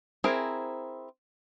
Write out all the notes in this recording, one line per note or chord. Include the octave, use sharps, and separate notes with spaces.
C4 E4 G#4 A#4